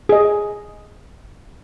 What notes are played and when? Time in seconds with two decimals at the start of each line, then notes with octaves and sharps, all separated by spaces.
0.09 G#4 D#5